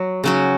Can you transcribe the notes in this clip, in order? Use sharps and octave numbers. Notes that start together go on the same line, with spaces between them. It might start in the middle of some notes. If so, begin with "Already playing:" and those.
Already playing: F#3 F#4
C#3 F#3 C#4 F#4